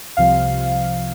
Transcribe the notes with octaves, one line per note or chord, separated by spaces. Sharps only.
C2 C3 F3 F5